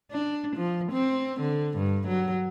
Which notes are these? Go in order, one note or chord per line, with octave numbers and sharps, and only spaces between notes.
D4
F3
C4
D3
G2
F#3